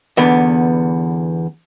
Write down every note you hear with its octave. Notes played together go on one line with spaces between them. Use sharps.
E2 D3 B3